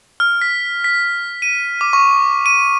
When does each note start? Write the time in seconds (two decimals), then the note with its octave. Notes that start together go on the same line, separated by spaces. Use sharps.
0.20 F6
0.42 B6
0.84 B6
1.42 D#7
1.81 D6
1.93 C#6
2.46 D#7